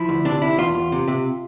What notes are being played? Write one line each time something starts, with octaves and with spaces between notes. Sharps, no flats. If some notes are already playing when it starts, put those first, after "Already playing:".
Already playing: F3 E4
D2
C3 D4
C3 E4
E2 F4
E2
C3
C3